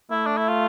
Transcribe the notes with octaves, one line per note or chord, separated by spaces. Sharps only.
A3 E4
D4
E4
F4